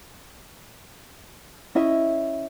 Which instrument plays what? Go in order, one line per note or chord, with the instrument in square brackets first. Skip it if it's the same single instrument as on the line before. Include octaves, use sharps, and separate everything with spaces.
[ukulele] C#4 E4 D#5 E5